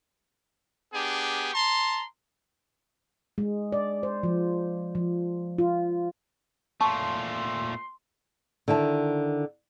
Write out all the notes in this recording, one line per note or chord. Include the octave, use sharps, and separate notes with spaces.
B3 D4 G4 G#4
A5 A#5 C6
G#3
D5
C5
F3
F3
F4
A#2 A3 A5 C6 C#6
D3 D#3 E4 A5